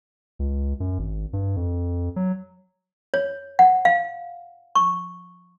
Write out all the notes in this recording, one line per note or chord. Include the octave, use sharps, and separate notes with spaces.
C#2
F#2
G#1
G2
F2
F#3
C#5
F#5
F5
C#6